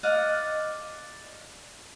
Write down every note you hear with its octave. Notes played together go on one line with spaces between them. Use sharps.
D5 D#5 F5 F#5